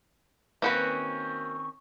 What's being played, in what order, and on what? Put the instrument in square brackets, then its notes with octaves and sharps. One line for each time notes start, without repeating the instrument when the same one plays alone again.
[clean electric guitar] D#3 C4 C#4 [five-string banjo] A#3 F#4 B4